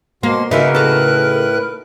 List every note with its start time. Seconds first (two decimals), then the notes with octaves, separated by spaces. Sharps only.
0.23 B2 A#3 C6
0.51 C#3 A#3 D#4 F#4 A#4 B4 E5
0.75 A2 A4 B4 A#5 F#6